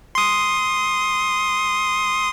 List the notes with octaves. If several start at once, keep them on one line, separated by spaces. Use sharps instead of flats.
C6 D#6